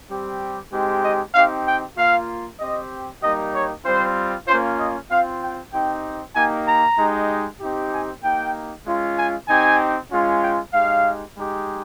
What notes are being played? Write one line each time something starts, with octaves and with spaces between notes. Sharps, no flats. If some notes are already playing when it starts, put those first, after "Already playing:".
G3 C4 G4
G#3 C4 D#4 G4
D#5
C4 D#4 G4 F5
G5
A#3 F4 F5
C4 G4 D#5
G3 A#3 D#4 G4 D#5
C#5
G3 C4 F4 C5
A#3 C#4 F4 C5
D#5
C4 F4 F5
G5
C4 D#4 G4 G5
A#3 D#4 G4 G#5
A#5
G#3 D#4 G4
C4 D#4 G4
G#5
A#3 D#4 G4 G5
G#3 C#4 F4
G#5
C4 D#4 G4 G#5
G#3 C#4 F4
G5
G#3 D#4 G4 F5
G#3 D#4 G4